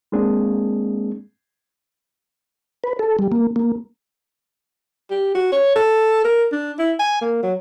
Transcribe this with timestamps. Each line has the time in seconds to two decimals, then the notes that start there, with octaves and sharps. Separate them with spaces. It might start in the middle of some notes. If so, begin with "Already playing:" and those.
0.12 G#3 A#3 C4 D4 G#4
2.84 B4
2.99 A4
3.19 G3
3.32 A#3
3.56 A#3
5.11 G4
5.35 F#4
5.52 C#5
5.76 A4
6.25 A#4
6.52 D4
6.79 E4
6.99 G#5
7.22 A#3
7.43 F#3